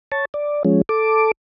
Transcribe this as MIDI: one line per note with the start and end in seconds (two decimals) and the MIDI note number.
0.12 0.25 73
0.12 0.25 81
0.34 0.63 74
0.65 0.81 53
0.65 0.81 56
0.65 0.81 61
0.89 1.31 69
0.89 1.31 86